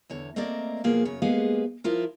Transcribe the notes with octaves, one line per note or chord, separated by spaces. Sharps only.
E2 D3 C#5
A3 A#3 C4 A#4 D5 D#5
B2 F3 F#3 A#3 F4 G#4
F#2 C#3 C#5
G#3 A#3 B3 G4 G#4 F5
F3 E4 F4 A#4